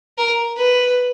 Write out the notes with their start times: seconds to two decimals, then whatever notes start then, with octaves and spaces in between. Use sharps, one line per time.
0.18 A#4
0.57 B4